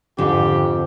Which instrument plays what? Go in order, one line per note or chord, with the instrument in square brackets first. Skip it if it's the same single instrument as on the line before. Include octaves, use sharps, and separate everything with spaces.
[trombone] F2 [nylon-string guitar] G#2 [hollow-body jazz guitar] D3 [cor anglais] G4